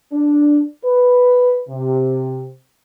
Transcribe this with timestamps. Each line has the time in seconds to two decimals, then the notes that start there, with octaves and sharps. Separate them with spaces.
0.13 D4
0.85 B4
1.69 C3